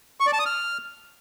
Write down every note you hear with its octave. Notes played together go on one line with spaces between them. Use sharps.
C#6
D5
A5
D#6
F6